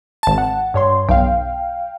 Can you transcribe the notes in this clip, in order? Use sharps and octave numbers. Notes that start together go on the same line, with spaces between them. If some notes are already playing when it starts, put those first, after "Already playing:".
G#1 A5
F#5
G2 C#5 C6
B1 F5 G5